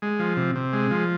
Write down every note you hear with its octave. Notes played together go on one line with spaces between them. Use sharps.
G#3
F3
C3
C3
G#3
F3